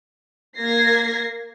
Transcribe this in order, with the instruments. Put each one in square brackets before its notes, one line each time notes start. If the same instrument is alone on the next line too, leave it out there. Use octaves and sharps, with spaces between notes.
[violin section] A#3 G#6 A#6 C7